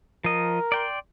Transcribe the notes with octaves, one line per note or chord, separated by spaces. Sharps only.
F3 A#4 D#5
D5 G5 C6